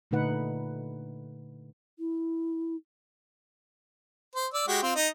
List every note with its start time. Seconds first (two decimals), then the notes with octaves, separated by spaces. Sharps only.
0.11 A#2 D3 A3 D#4 B4 F#5
1.99 E4
4.35 C5
4.54 D5 E6
4.68 G#3 F#4 G4
4.82 C4 F4
4.96 D#4 D#5